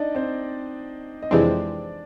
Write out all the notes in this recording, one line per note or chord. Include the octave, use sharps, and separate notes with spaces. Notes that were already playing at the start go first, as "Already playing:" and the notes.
Already playing: D4 D#4 D5 D#5
C4 C5
D#5
F2 C3 E3 G#3 C4 D4 D5